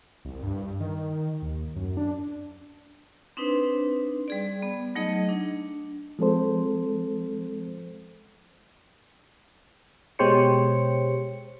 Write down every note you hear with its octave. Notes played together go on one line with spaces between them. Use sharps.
C2
G2
D#3
D#2
F#2
D4
C4 D4 D#4 B4 C5
G3 G#4 D5
B3
F#3 A3 D#4 G#4 D#5
D4
F3 G#3 C4 A4 C5
B2 G#3 G4 C5 C#5 C#7